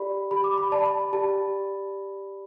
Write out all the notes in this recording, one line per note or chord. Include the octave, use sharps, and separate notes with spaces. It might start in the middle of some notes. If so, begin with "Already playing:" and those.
Already playing: G4 D5 B5
G4 B5
D6
B5
D5 A5
B5
A5
G4 A5